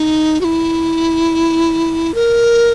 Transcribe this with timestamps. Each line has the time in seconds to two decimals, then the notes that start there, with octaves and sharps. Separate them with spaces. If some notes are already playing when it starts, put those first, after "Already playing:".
Already playing: D#4
0.41 F#4
0.44 E4
2.14 A#4